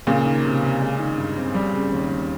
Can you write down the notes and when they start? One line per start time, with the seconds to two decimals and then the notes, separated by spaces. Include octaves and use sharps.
0.07 A#2 C#3 A#3
0.25 D#3
0.45 C3
0.63 C3
0.80 G#3
0.99 D#3
1.18 G2
1.36 C4
1.54 G3
1.73 C#3
1.92 D#2
2.10 D#2